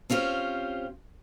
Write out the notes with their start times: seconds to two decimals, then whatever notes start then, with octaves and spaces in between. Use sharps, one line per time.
0.10 C4 C#4 F4 G4 C5